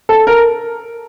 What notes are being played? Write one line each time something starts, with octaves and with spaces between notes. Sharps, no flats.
A4
A#4